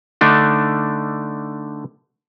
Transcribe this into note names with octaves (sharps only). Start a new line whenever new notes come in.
D3 A3 D4 D#4